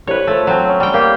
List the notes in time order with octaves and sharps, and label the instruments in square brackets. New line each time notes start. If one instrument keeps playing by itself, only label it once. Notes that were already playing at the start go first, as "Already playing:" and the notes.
[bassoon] C2 [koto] B4 C#5
[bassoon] F3 [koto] A3
[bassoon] F3 [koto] F#3 C4
[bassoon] C#4
[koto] G3 G5
[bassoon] A#3 [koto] G4